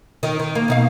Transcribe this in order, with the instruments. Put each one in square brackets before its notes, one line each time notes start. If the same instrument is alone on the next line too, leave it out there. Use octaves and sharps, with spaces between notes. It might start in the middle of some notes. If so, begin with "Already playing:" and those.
[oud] D#3
D#3
A#3
B2 D#4 F5